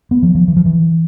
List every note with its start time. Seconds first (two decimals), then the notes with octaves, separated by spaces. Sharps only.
0.11 B3
0.23 F3
0.35 F3
0.48 E3
0.57 F3
0.65 E3